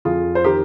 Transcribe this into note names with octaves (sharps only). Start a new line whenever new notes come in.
F2 F4 G#4
C5
D#3 G4 A#4